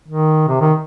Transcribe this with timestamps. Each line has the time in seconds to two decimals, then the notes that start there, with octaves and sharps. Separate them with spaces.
0.08 D#3
0.48 C3
0.60 D#3